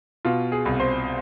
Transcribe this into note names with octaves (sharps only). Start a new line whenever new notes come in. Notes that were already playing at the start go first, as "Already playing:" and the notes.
B2 F4
G#4
C2
C5